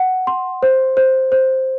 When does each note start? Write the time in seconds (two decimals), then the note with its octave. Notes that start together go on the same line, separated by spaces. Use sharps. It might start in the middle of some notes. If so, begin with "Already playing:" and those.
Already playing: F#5
0.27 C6
0.63 C5
0.97 C5
1.32 C5